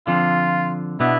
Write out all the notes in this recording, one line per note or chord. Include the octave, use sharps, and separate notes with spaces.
D3 F3 C4 F4
B2 B3 D4 E4